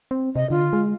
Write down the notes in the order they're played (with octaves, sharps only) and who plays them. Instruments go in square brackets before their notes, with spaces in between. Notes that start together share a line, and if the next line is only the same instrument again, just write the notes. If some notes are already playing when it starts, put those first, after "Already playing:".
[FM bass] C4
[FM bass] C3 [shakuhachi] D#5
[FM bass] D3 [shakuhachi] F4
[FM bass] G#3